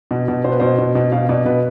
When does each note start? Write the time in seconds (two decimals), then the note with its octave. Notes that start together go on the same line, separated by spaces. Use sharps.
0.11 B2
0.28 B2
0.44 B2 C5
0.52 B4
0.60 B2 C5
0.78 B2
0.95 B2
1.12 B2 F5
1.29 B2 D5
1.46 B2 B4